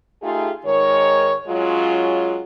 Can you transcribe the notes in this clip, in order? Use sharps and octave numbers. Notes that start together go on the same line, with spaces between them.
A3 D#4 F4 G4 G#4
G#2 D#3 G#3 A#4 C#5
F#3 G#3 C#4 F4